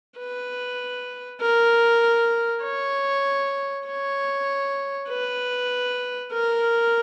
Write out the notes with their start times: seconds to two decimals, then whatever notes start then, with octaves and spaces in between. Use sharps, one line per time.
0.18 B4
1.41 A#4
2.63 C#5
3.87 C#5
5.09 B4
6.32 A#4